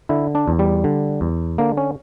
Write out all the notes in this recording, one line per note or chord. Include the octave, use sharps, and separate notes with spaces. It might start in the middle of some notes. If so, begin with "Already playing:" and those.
D3 E4
D4
E2
G3
D3
E2
D3 A#3
C#4